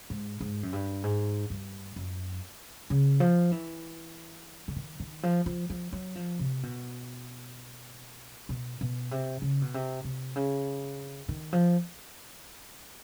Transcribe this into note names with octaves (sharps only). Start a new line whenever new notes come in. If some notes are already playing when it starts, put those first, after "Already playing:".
G#2
G#2
F#2
G2
G#2
G2
F#2
C#3
F3
E3
D3
D#3
D#3
F3
F3
F3
F#3
F3
C3
B2
B2
B2
C3
C#3
B2
C3
C3
C#3
D#3
F3